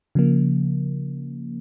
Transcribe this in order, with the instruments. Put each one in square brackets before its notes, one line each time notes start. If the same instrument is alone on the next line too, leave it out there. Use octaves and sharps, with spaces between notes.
[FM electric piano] C#3 F3 A#3